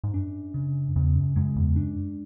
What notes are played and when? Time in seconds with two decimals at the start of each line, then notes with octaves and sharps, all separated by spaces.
0.04 G#2
0.14 F#2 D4
0.54 C#3
0.96 E2 C#3
1.16 F#2
1.36 F#2 G#3
1.56 E2
1.76 F#2 D4